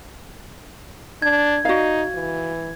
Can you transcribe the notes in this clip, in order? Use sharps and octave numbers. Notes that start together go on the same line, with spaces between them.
D4 G#6
D#4 F#4 D5 F5
E3